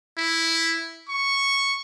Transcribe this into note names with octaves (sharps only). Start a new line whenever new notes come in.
E4
C#6